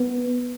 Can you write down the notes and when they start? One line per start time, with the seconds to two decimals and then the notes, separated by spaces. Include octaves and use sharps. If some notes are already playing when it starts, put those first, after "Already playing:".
Already playing: B3